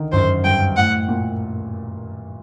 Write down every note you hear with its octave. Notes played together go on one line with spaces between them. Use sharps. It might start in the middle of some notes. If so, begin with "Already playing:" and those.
Already playing: D3 D#3
F#2 C5
G2 G5
A2 F#5
A#2